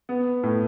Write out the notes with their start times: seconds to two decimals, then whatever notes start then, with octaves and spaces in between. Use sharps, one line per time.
0.09 B3
0.43 A2